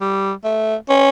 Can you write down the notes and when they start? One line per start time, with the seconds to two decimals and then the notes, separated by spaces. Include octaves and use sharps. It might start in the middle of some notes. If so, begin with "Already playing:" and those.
0.01 G3
0.44 A3
0.89 C#4